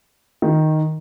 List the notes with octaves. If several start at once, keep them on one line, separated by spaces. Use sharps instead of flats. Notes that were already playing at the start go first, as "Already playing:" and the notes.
D#3